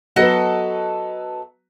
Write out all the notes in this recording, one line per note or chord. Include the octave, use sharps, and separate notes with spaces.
F#3 B3 F#4 A4 B4 D#5